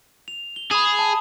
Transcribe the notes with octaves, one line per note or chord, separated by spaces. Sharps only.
F7
G7
G#4 B5 D#6 E7
A5 D#6